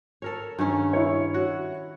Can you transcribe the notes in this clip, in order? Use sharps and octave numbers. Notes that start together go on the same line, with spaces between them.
A4 A#4 C#5
G2 D#3 C#4
E4 C#5
F#4